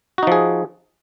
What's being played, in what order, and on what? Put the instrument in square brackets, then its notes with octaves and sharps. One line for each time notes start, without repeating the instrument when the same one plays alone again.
[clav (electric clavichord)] F#4
D#4
F3
G#4